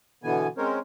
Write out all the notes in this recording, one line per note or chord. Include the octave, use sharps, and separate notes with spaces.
B2 D3 E3 B3 G#5
G#3 C4 C#4 A#4 C5 C#5